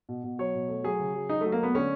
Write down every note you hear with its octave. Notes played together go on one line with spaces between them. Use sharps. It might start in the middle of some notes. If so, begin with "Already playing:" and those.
B2
B2
F#3 C#5
B2
A3
F#3 G#4
C#3
F#3
F#3 D#4
F#3 A3
A#3
A3 B3
D3 C#4